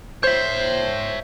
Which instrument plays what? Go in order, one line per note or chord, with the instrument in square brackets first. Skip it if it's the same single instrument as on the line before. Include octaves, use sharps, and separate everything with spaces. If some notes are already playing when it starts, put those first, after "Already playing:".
[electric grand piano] C5 G6 [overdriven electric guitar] C#5 E5